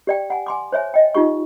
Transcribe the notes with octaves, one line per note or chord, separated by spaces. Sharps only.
G4 D5 G5
F#5 G#5
G#5 C6 D6
C5 C#5 E5 G#5
D#5 G5
D#4 F4 G4 C#6